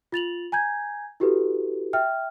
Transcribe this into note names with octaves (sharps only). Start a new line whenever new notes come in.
F4 A6 F7 F#7
G#5 A#5 G6 G#6
E4 F#4 G4 A4 B4
E5 G5 F6